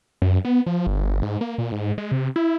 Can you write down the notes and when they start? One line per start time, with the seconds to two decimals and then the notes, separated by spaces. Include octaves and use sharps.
0.22 F#2
0.45 B3
0.66 F3
0.87 G1
1.22 G#2
1.41 A#3
1.58 A#2
1.72 G#2
1.98 G#3
2.12 C3
2.36 E4